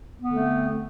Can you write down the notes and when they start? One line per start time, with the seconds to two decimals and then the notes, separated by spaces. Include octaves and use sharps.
0.22 B3
0.26 D3
0.30 C4
0.34 A3